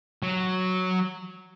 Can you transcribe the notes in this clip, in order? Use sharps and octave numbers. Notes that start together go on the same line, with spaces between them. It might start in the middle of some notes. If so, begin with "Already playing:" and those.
F#3